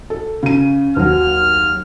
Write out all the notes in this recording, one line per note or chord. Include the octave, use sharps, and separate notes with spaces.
A4
C#3 D#7
D#2 F#3 F6